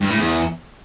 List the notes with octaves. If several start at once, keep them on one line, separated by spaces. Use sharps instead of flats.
G2
A2
E2